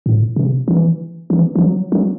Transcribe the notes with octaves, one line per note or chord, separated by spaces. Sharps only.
A2
C3
E3
E3
E3
F#3
F#3